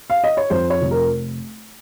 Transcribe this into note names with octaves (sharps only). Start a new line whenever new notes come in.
F5
D#5
C#5
F2 C5
C#5
F1
A#4